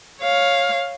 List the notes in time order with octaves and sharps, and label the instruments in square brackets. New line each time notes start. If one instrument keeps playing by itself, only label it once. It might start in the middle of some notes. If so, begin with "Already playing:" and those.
[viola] C#5 F5